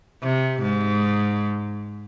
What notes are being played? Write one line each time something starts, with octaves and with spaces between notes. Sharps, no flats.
C3
G#2